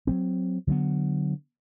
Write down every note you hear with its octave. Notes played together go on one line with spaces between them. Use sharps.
F#3 G3 C4
D3 F#3 A3 B3